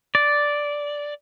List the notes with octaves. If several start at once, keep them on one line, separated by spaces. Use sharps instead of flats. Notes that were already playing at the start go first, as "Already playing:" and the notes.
D5